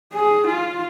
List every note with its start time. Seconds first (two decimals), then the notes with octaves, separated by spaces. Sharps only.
0.13 G#4
0.47 F4